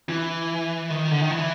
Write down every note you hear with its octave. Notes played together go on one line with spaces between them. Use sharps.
E3
D#3
D3
D#3
E3